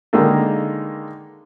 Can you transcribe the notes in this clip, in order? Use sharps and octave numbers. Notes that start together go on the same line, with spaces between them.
D3 D#3 G#3 A#3 D#4 A4